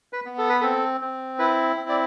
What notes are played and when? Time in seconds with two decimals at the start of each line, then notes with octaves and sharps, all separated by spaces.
0.13 B4
0.25 B3
0.38 A4
0.49 B4
0.61 C4 A4
1.01 C4
1.39 E4 B4
1.76 C4
1.89 D5